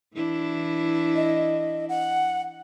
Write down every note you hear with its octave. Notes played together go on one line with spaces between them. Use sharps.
E3 D4 E4
D#5
F#5